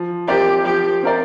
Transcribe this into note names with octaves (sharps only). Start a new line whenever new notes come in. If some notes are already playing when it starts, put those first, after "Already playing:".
Already playing: F3
C4 G4 A#4 D5
F3 G4
C4 F4 A#4 D5